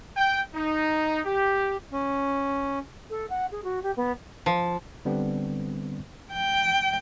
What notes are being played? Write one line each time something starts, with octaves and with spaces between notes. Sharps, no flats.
G5
D#4
G4
C#4
A4
F#5
G#4
F#4
G4
B3
F3
D3 G3 B3 C4 D4
G5